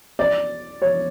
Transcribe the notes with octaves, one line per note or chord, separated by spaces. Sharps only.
D5
C#5